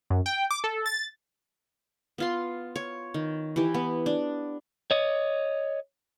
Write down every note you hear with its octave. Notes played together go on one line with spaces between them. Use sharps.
F#2
G5
D6
A4
A6
B3 F4 C6
C#5
D#3
E3 G4
B3
D4
C#5 D#5